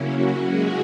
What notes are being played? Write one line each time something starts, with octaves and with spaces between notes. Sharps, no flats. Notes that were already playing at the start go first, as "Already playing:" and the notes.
Already playing: C#3 F#3 A#3 C#4 E4
F#3 F#4
G#3 G#4